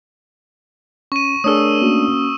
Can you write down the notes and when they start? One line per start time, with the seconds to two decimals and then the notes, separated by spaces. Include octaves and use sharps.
1.12 C#4 C#6 D#7
1.44 A3 D4 G#4 A#4 C#5 D#6 E6
1.82 A#3 C#4 F#4